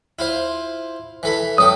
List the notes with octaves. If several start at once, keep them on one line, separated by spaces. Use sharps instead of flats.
E4 F4 C5
E3 A4 B5
F#2 A4 G5 D#6